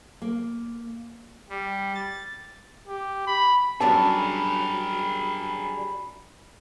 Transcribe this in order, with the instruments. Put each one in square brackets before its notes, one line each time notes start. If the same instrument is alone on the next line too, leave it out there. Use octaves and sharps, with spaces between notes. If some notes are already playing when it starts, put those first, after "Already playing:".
[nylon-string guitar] A#3
[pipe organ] G3
A6
[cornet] G4
B5
[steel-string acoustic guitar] F#2 G3 D4 [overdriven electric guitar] G#4 A#4 [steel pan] A5 [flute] B5